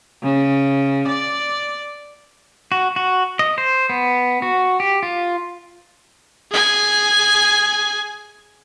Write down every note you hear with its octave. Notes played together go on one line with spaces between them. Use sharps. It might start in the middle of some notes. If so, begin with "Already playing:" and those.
C#3
D5
F#4
F#4
D#5
C5
B3
F#4
G4
F4
G#4 G#5